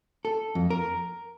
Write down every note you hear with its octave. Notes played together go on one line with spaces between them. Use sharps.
A4
F2
A#4